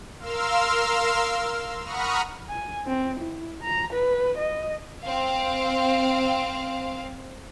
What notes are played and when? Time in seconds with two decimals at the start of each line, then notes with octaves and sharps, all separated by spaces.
0.20 A#4 F5 C6 E6 F6
1.83 F#5 A#5 B5 C#6 D#6 F6
2.49 G#5
2.86 C4
3.20 E4
3.63 A#5
3.93 B4
4.38 D#5
5.02 C4 F5